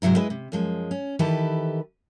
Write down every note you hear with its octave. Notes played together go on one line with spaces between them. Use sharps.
G#2 C3 F#3 E4 A#4
G#3 E4 B4 D#5
C3
F#2 F3 G#3
C#4
D#3 E3 E4 G4 A4 B4